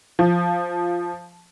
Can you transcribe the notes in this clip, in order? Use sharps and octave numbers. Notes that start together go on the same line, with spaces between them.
F3